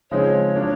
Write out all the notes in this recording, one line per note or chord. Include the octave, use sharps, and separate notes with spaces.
C#3 F3 G#3 C4 D#4 C#5
F#3 A#3 D4